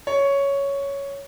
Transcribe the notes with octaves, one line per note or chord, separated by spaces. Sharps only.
C#5